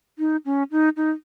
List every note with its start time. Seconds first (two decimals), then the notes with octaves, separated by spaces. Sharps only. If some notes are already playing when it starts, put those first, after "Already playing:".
0.19 D#4
0.45 C#4
0.71 D#4
0.97 D#4